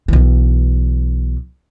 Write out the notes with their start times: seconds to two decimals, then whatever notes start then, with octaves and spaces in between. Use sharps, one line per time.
0.08 B1 E3